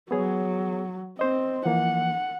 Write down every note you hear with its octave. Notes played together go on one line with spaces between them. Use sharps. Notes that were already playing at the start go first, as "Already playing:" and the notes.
F#3 B3 G#4 C#5
C4 C5 D#5
E3 F3 A#3 F#5